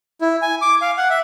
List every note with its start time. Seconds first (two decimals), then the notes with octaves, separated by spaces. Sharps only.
0.21 E4
0.42 G#5
0.62 D6
0.82 F5
0.98 F#5
1.10 E5